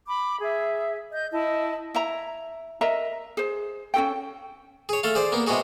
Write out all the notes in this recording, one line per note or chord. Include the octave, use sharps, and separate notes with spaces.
B5 D6
G#4 E5
D#5 G6
E4 D#5 A5
E4 E5 A#5
A#4 D#5 E5 A#5
G#4 C5
C#4 F#4 A4 G5
G#4 C#5
A3 A4 F5
G#4 C5 D5
A#3 B3
C3 G#3 B3 F#4 G#4